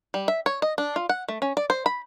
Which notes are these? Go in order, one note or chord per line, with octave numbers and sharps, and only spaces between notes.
G3
E5
C#5
D#5
D4
F4
F#5
A3
C#4
D5
C5
B5